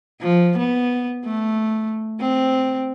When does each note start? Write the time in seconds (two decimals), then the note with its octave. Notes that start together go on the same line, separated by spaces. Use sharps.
0.21 F3
0.58 B3
1.25 A3
2.20 C4